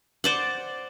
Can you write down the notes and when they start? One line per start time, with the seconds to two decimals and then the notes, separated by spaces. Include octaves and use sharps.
0.24 C5 D5 F#5